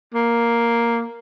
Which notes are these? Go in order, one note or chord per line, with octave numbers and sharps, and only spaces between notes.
A#3